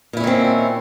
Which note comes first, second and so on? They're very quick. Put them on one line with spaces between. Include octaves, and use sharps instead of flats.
A#2 E4 C#4 D#3 C4